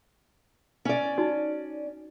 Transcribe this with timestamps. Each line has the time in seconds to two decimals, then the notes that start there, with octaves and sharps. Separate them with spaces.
0.85 C#4 D5
1.18 D#4 F#4